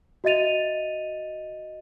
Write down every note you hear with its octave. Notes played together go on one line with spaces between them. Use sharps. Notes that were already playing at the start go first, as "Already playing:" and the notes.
F#4 D#5 E5 A6 D#7 F7